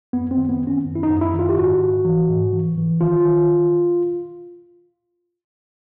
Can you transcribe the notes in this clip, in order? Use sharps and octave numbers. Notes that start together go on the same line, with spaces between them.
F#2 B3
C4
D#3
B3
D#3
C#4
F#2
E4
D#4
F#2
E4
D#3
F4
G4
G#2 F#4
G#2
E3
G#2
E3
E3
D#3 F4
D#3